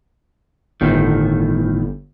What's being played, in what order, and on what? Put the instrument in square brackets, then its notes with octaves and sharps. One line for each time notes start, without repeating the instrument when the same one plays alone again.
[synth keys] G1 [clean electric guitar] A2 D#3